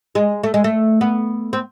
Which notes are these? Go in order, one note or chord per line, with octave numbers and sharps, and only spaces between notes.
G#3
A3
G#3
A3
B3
C4